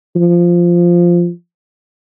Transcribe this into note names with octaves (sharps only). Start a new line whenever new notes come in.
F3